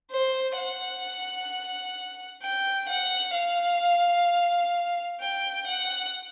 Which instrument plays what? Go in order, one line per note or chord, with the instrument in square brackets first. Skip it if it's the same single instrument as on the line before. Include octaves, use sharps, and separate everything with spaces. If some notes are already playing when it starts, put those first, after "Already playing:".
[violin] C5
F#5
G5
F#5
F5
G5
F#5